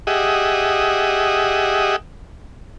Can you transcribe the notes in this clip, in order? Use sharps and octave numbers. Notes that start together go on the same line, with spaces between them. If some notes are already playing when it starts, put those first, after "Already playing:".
G4 G#4 D#5 E5 F#5